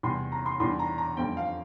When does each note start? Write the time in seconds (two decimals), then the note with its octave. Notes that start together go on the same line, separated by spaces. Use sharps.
0.03 E2 C3 G3 C6
0.32 A#5
0.46 C6
0.60 E2 E3 G3 D4 C6
0.79 A#5
0.98 A#5
1.17 F2 D3 G3 C4 F4 G5
1.37 F5